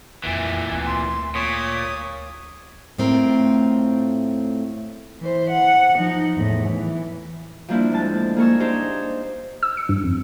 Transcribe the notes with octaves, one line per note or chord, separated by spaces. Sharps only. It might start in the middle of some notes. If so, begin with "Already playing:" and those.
A#1 F2 A#2 E3
D2 C4
C6
A#2 C#5 D#6
A2 A3 C4 F4 A#4
E3 C5
F#5
F3 D#4
E2 A2
E3
F3 G3 A#3 C4 D4 E4
D2 G#3 A5
A#3 G#4 A#4 C#6 E6
D4 D#4 G4 G#4 C5
E6
C#7
G2
F2